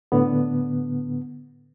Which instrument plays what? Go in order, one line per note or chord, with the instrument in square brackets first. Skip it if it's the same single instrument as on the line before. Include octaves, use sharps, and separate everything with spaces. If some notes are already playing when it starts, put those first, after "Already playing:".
[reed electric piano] A2 D3 B3